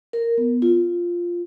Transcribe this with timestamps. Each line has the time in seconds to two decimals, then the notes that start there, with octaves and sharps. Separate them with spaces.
0.13 A#4
0.38 B3
0.62 F4